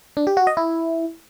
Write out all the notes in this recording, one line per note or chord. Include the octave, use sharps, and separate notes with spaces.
D4
G4
F#4
D#5
E4